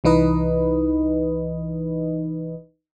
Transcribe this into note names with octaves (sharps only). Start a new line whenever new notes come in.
C2 E3 D#4 B4 D#5